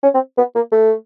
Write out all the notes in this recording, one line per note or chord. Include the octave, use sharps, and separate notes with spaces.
C#4
C4
B3
A#3
A3